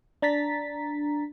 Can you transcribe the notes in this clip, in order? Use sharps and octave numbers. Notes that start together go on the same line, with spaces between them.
D4 A#5 A6 B6